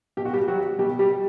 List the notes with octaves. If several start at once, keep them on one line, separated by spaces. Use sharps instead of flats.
B2 G4
F#4
G3 G4
F#3 G3 F#4
B2 G3 G4
G3 G4
G3